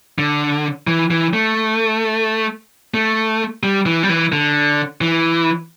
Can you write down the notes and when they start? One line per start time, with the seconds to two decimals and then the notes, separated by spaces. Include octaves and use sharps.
0.18 D3
0.87 E3
1.11 E3
1.33 A3
2.94 A3
3.63 G3
3.86 E3
4.03 G3
4.09 E3
4.32 D3
5.01 E3